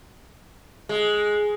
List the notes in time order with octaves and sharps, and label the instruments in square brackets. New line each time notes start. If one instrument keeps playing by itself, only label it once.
[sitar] G#3